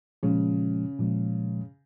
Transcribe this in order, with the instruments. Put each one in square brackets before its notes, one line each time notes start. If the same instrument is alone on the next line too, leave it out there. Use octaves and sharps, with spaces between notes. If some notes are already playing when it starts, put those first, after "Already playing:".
[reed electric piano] A#2 F3 G#3 [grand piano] C#3
[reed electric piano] A#2 F3 G#3